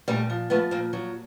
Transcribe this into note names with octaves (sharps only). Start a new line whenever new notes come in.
A#2 G3 A3
F3
F3 A3 B3
A#2 A#3 C4
F3 F#3